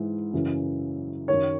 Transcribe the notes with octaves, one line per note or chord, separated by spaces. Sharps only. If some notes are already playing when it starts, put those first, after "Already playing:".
Already playing: G#2 E3
F#2 C#3 E3
F#2 D#3 C#5